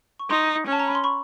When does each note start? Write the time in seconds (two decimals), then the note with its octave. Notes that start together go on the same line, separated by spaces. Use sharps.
0.19 C#6
0.30 D#4 A#5 C6
0.67 C#4
0.72 A5
0.80 A#5
0.88 B5
0.95 C6
1.04 B5 C#6